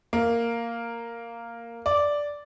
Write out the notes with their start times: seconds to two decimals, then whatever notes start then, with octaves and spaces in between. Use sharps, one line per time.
0.13 A#3
1.86 D5